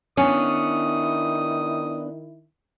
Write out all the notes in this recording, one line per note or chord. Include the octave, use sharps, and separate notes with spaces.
D#3 B3 C#4 D4 E4 D#6